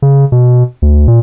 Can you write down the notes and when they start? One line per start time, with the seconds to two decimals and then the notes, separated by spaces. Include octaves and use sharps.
0.02 C#3
0.32 B2
0.82 D2
1.08 A#2